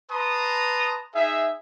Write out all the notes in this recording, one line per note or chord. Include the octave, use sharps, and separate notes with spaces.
B4 A5 A#5 C6 D#6
D#4 G#4 E5